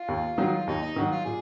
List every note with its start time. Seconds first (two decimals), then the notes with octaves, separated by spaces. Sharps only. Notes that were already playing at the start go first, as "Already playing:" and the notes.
Already playing: F4
0.08 D#2
0.38 D#3 F#3
0.67 D#2 D#4
0.82 D#4
0.96 D#3 F#3 F#4
1.11 F4
1.25 A#2 G#4